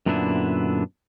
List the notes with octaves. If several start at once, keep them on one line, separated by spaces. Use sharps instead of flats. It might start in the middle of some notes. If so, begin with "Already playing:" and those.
F#2 A#2 D3 B3 D4 E4